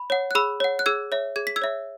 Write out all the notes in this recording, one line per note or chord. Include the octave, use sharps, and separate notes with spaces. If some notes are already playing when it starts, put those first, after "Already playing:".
Already playing: B5
C#5 F#5
F#6
G#4 B5 E6
C#5 F#5
F#6
G#4 E6 G#6
C#5 E5
G#4 G#6
B6
E6 G#6
C#5 E5